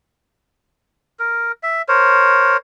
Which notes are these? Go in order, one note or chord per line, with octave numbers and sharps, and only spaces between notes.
A#4
E5
A#4 C5 C#5